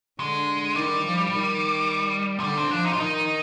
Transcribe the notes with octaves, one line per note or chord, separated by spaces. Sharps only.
D3 G#3
D#3 G3
F3
D#3
F3
D3 G3
C4
F3 D4
D#4
F4
D#3 D#4